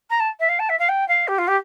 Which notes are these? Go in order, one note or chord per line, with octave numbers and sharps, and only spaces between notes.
A#5
A5
E5
F5
A5
E5
F5
G5
F5
G4
F4
G4